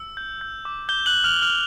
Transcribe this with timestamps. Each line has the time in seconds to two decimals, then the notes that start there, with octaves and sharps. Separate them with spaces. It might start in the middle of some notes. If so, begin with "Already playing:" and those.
Already playing: E6
0.17 G6
0.41 G6
0.65 D6
0.89 D6 G6 G7
1.06 F#6 F#7
1.13 G6
1.24 F6 F7
1.36 G6
1.42 F6 F7